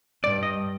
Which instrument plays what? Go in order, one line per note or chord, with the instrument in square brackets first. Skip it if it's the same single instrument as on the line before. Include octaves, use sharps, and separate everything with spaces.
[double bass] G2 [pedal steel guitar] D5
[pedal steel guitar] D#5